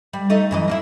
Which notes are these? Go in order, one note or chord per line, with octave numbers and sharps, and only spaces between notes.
G3
A3 D#4
F#2 E3 D#5
A#3 C#4 E4